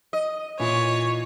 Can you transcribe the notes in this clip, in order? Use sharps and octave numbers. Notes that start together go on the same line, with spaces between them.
D#5
A#2 E3 C#5